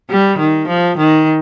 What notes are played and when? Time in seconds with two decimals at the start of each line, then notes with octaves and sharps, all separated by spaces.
0.10 G3
0.39 D#3
0.68 F3
0.97 D#3